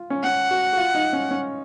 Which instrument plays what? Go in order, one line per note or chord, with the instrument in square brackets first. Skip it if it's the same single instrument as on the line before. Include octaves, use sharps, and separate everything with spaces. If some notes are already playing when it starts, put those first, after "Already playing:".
Already playing: [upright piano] F4
C#4
[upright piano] C#4 [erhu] F#5
[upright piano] F#4
F#4
F4
D#4
C#4
C#4